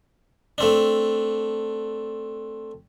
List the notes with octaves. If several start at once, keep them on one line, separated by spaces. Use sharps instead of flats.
A3 C4 D4